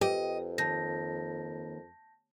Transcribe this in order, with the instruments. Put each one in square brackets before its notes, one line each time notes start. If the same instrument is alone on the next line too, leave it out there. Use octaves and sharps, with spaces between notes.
[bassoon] F2 [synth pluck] G4 G5 [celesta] B4 [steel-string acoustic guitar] D#5
[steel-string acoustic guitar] D#2 [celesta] A5 G6 A#6